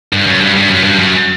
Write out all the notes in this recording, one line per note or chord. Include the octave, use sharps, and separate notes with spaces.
G2
F#2
G2
G2
F#2
G2
F#2